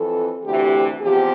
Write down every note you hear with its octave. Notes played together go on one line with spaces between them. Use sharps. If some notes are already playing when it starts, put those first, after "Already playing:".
Already playing: F2 E3 A4
D2 C3 E3 G4
E2 C3 F3 G4